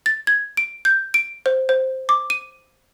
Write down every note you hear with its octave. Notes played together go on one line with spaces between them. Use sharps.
A6
G#6
D7
G6
D7
C5
C5
D6
D#7